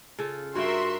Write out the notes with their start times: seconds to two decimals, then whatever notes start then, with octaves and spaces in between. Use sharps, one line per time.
0.19 C#3 F4 A4
0.55 G2 F4 F#4 A#4 E5 G5 C6